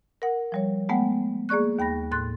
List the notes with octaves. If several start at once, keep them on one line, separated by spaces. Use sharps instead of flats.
A#4 F#5
F3 G3 C#5
G#3 A3 B3 F#5 G5
A#3 G#4 D5 C#6 F#6
D#2 G5 B5 A#6
A2 C6 F#6 A6